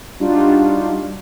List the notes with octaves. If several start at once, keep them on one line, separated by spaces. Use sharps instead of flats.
G3 D4 D#4 F4 F#4